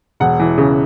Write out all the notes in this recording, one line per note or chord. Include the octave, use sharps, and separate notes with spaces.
E1 F#5
E3
C#3